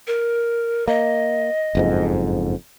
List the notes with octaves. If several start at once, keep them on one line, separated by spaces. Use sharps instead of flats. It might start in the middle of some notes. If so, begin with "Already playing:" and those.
A#4
A#3 D#5
F#1 F2 G#2